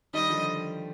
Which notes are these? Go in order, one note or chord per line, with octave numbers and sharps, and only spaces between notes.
D#3 G3 D#5
D3 F3